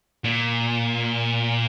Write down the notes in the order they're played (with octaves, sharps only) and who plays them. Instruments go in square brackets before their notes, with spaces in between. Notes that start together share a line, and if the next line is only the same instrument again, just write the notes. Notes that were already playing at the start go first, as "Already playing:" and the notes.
[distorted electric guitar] A#2